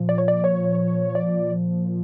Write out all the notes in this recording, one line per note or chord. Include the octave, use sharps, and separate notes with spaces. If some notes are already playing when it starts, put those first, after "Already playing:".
Already playing: A#2 F3
D5
C#5
D5
C#5
D5